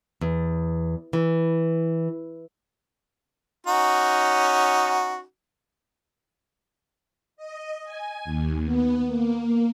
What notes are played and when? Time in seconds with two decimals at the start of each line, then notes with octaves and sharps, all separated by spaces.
0.21 E2
1.13 E3
3.67 C#4 D#4 F#4
7.37 D#5
7.84 G#5
8.24 D#2
8.65 B3
9.07 A#3